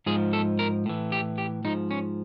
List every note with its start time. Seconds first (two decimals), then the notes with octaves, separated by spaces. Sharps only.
0.06 G#2 F3 G#4
0.33 A4
0.59 A#4
0.86 A2 E3
1.12 G4
1.38 G4
1.65 G#2 F3 D#4
1.91 C#4